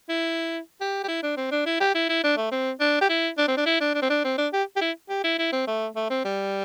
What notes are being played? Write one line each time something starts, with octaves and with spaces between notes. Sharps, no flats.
E4
G4
G4
E4
D4
C4
D4
E4
G4
E4
E4
D4
A3
C4
D4
G4
E4
D4
C4
D4
E4
D4
D4
C4
D4
C4
D4
G4
G4
E4
G4
E4
E4
C4
A3
A3
C4
G3